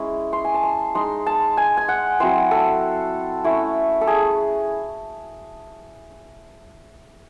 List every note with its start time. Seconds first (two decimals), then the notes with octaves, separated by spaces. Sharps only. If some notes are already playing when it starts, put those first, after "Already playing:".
Already playing: G#3 C#4 E4
0.33 C6
0.45 G#5
0.54 A5
0.63 C6
0.95 G#3 D#4 C6
1.26 A5
1.57 G#5
1.77 G#5
1.88 F#5
2.20 F#3 C4 E4 C5
2.51 A4
3.44 A3 C#4 E4
4.01 A4
4.07 G#4